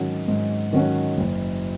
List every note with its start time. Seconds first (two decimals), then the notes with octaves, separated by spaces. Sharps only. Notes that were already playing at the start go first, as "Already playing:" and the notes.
Already playing: G#2 D#3 F#3 C#4 F#4
0.28 G#2
0.73 D#3 F#3 C#4 F#4
1.18 F#1